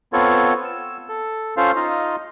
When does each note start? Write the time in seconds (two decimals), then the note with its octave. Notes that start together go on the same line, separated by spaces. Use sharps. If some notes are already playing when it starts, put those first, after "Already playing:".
0.13 B3 C4 F4 A4 C#5
0.64 E6
1.09 A4
1.57 C#4 F4 A4 C5 F5
1.76 D#4 F4 D#5